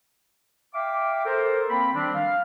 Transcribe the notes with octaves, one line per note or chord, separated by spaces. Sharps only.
E5 F5 G5 D6
A4 A#4 C5
A#3 C4 G5 B5
D#3 F3 G3 C4 D4
F5